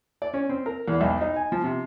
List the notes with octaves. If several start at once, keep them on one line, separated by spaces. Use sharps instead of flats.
D5
C#4
C4
A#4
E2
B1
D#4
G#5
F3
C3